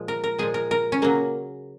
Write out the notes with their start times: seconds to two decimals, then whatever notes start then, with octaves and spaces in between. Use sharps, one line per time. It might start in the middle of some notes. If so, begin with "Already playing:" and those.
Already playing: A#2 F3 G#3
0.08 A#4
0.24 A#4
0.39 A#2 F3 G#3 G#4
0.54 A#4
0.71 A#4
0.92 C#4
1.02 C#3 F#3 A#3